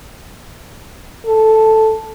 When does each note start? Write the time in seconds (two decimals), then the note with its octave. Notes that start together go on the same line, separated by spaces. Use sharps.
1.27 A4